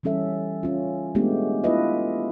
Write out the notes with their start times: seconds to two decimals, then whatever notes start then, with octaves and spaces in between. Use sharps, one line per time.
0.03 E3 G3 C#4 A4 E5
0.63 C#4 F4
1.15 G#3 A3 B3 C#4 D4 G4
1.64 B3 E4 F4 B4 D#5 E5